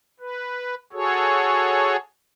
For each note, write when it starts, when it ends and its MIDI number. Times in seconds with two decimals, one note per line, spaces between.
0.20 0.75 71
0.93 1.96 66
0.93 1.96 68
0.93 1.96 69
0.93 1.96 73